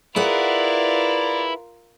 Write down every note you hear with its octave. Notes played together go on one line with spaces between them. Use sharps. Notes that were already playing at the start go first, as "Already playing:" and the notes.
E4 F4 G#4 A#4 B4 D5 F#5